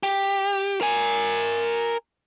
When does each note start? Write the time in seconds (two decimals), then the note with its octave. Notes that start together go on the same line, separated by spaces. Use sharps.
0.03 G4
0.81 A#4 G#5